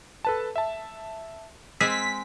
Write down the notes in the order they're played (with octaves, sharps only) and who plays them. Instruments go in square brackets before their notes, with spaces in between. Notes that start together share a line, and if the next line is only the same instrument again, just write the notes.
[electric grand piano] A4 B4 A5
E5 A5
[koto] G#3 C4 G#4 [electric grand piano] E6 [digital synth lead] B6